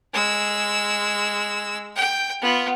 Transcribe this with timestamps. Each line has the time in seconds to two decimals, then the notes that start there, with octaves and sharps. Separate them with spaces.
0.14 G#3 E6
1.96 G5
2.42 B3 F4